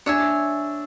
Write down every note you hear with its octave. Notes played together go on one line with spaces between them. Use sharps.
D4 C#5 E5 G#5